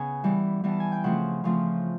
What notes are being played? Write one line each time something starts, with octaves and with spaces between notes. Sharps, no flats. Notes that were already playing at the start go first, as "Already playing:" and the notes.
Already playing: C#3 B3 G#5
E3 G3 B3
E3 G3 B3 A5
G#5
G5
C#3 F3 A3 C4 F#5
C#3 F3 A3 C4